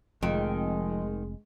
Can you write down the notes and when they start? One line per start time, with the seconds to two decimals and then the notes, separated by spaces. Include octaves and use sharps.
0.23 F1 F2 D#3 G#3